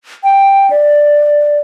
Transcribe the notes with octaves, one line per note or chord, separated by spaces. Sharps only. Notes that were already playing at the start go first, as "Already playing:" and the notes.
G5
D5